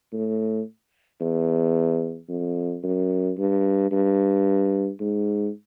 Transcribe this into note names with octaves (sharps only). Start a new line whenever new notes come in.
A2
E2
F2
F#2
G2
G2
G#2